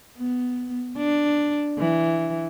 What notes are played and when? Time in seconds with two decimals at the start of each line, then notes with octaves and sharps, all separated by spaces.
0.17 B3
0.97 D4
1.78 E3